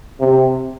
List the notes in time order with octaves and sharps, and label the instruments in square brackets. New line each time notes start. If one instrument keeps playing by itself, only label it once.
[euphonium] C3